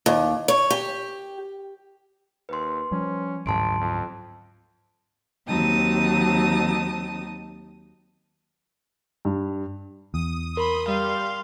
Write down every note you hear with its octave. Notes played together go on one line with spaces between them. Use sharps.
D#2
C#5
G4
D#2 B4 C6
F3 G3 C#4
A1 D2 G#2 F#3 A5 C6 D7
F2
D#2 F#3 C4 D#4 A5 D#6
G2
E2 D#6
A#4 B5 C6
G3 F5 C6